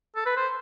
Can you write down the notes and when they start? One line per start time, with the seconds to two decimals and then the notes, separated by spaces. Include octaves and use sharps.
0.16 A4
0.26 B4
0.37 C5